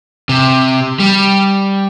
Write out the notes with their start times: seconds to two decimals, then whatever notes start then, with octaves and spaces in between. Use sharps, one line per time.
0.29 C3
0.99 G3